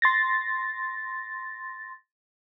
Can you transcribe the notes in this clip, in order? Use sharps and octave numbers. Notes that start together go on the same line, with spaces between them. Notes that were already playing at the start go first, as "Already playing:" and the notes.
C6 A6 A#6